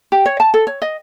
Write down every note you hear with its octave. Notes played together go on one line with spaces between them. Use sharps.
G4
C#5
A5
A4
C#5
D#5